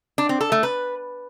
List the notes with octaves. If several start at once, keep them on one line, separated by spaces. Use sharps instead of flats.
D4
C4
A4
A3
B4